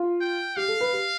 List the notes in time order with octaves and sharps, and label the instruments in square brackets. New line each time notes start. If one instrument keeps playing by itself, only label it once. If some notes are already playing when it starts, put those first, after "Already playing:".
Already playing: [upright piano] F4
[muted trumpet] G5
[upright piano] G4 [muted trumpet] F5
[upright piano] A4
B4
G4